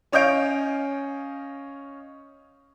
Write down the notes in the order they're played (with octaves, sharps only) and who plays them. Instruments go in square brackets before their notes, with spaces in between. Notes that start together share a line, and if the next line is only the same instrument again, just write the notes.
[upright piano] C#4 C#5 D#5 F5 G6 D7